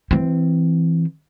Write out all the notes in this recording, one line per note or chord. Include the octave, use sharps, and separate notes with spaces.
E3 C4